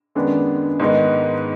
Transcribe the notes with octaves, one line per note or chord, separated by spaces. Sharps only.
F#2 D#3 G#3 B3 D4
G#2 D#3 G#3 B3 D#4